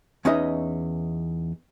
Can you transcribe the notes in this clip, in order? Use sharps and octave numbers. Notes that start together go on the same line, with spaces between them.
E2 C#4 D#4 B4 D#5 E5